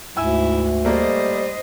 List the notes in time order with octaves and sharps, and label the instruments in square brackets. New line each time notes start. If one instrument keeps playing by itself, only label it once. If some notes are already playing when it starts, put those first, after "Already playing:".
[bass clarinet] D2 [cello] G#2 [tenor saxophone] E4 [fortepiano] G#5 E6
[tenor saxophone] G3 [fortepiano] A3 A#3 [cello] C5 D#5